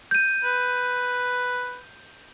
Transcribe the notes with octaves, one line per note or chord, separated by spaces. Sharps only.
G6 D#7
B4